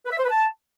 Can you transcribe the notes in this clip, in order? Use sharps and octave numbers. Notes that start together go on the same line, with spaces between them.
B4
E5
C5
B4
A5